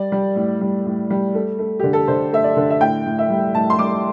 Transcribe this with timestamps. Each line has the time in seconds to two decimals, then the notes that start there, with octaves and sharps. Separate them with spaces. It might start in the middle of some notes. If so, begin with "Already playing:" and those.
Already playing: G3 D5
0.12 G3
0.36 A2
0.61 G3
0.86 A2
1.10 G3
1.35 A3
1.59 A3
1.80 D3 G4
1.93 A4
2.08 D3 C5
2.33 A3 E5
2.44 D5
2.56 D3
2.70 E5
2.81 A2 G5
3.06 A2
3.19 E5
3.30 G3
3.54 A2 A5
3.70 C6
3.79 G3 D6